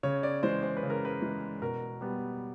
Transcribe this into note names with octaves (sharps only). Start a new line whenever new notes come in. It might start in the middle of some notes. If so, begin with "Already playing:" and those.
C#3 C#5
D5
E3 G#3 C5
C5
B4
C#3
A#4
B4
E3 G#3
B2 A#4
G3 B3